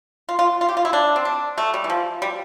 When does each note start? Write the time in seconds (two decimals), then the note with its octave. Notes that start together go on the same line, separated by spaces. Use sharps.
0.29 F4
0.39 F4
0.61 F4
0.69 G4
0.77 F4
0.85 E4
0.93 D4
1.16 C4
1.25 D4
1.58 A3
1.74 G3
1.84 E3
1.90 F3
2.22 G3